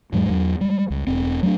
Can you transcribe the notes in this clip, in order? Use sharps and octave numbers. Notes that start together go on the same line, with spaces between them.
E2 G#2 F#3 G#3
E2 F#3
G3 G#3
C#2
E1 C4
F#3 A3 B3 D4